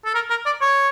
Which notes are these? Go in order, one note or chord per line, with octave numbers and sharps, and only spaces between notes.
A4
A#4
A#4
D5
C#5